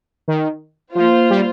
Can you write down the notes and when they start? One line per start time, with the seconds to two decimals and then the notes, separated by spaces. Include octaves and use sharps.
0.28 D#3
0.95 F3 A#3 F4 C5
1.30 G3